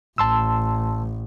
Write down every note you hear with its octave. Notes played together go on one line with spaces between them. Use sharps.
A1 A5 C6 E6